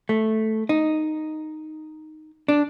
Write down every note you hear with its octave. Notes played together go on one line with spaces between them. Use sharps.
A3
D#4
D4